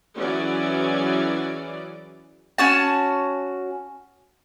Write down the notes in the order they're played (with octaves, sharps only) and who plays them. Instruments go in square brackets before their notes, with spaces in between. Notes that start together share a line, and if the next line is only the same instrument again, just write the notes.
[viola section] E3 F#3 C#4 G#4 D5
[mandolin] C#4 F#4 A5